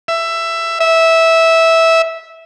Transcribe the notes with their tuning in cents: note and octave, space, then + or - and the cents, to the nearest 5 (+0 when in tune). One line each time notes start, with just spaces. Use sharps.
E5 +15
E5 -10